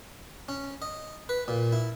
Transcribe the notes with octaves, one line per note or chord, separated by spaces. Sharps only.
C#4
D#5
B4
A#2
E4